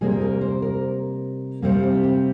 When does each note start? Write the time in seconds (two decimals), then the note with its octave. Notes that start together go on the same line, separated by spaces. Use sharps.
0.01 C3 G3 A#3 G#4
0.11 G#4
0.21 A#4
0.41 C5
0.62 A#4
1.62 C3 G3 A#3 C4
1.83 C4
2.04 C4